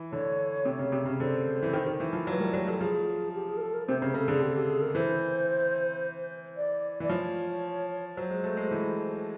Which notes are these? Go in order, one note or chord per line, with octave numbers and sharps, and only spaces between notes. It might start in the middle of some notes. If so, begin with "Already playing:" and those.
Already playing: E3
D3 C#5
C3
C#3
C3
C#3
D3 C5
E3
D#3
D#3
E3
F3
F#3 B4
G3 A#4
F#3
F#3 A4
F3 G#4
G4
G#4
A#4
A4
A#4
C3 C5
C#3 C5
C#3 A4
D3 G#4
G4
G4
G#4
A#4
E3 C5
D5
E3 D5
F3 C#5
F#3 C5
G#3
A3
G#3
E3